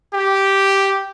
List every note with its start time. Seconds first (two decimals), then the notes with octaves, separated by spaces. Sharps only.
0.14 G4